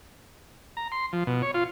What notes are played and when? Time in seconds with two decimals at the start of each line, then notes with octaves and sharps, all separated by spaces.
0.77 A#5
0.92 C6
1.13 F3
1.27 B2
1.42 C#5
1.54 F4